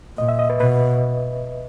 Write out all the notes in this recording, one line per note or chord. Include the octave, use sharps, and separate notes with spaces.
A#2 D#5
E5
D#5
B4
B2 B4